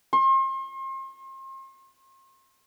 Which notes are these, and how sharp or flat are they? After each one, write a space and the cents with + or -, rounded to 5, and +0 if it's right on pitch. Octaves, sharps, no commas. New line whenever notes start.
C6 +40